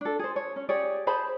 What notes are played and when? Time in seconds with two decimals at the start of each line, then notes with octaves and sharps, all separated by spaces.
0.01 D4 A4
0.19 G#4 C5
0.36 C#5
0.56 C#4
0.69 G4 G#4 C#5 D5
1.07 G#4 C5 A5 B5